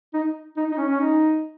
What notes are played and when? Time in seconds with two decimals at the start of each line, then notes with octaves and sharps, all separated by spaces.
0.13 D#4
0.57 D#4
0.71 D#4
0.77 C#4
0.89 C#4
1.00 D#4